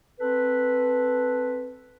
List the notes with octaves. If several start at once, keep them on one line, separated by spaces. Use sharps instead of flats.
C4 A4 B4